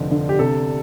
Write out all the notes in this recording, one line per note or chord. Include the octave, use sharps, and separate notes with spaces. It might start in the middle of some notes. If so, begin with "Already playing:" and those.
Already playing: F1 D3 F3
D3
G4
C3 A4